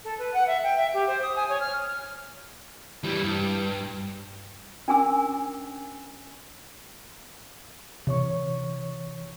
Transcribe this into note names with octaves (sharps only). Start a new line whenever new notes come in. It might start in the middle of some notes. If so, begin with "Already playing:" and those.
A4
B4
F#5
E5
G5
E5
G4
C5
D#6
G#5
C#5
F6
E3 G3
G2
C#4 D4 A#4 G#5 D6 E6
C3 E3 C#5 C#6